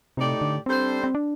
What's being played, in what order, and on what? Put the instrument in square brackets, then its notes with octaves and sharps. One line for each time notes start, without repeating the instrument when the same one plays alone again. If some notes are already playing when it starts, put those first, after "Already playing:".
[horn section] A2 A3 D#4 G4 D5 [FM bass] C3
[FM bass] D3
[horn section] G3 D4 A4 C5 [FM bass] C4
[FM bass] C4
D4